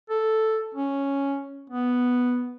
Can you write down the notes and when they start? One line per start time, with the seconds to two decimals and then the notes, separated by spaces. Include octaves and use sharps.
0.10 A4
0.75 C#4
1.70 B3